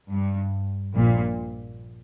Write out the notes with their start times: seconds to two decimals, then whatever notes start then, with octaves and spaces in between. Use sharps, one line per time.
0.10 G2
0.93 A#1 A#2